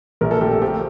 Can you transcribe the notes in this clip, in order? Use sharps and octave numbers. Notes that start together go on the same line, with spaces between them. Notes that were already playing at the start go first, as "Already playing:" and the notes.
A#1 A#4
A4
A3 G4
A4
C4 G4